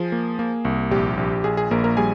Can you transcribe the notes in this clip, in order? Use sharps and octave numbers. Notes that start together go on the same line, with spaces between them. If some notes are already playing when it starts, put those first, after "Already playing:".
Already playing: F3 G#4
A#3
A#3
C2
A#1 G4
A#1
A#1 G#4
G#4
A#1 A#3 A#4
A#3 A#4
G3 G#4 G#5